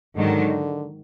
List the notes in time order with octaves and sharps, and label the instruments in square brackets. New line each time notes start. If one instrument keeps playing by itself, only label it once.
[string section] G#2 D#3 F#3 [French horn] D3